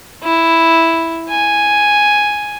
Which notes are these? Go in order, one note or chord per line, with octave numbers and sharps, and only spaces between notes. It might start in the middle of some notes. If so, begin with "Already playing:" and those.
E4
G#5